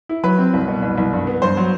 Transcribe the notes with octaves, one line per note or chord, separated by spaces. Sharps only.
E4
F#3 B4 B5
C4
C2
B2
C2
C2
G2
B3
G2 C5 C6
F#3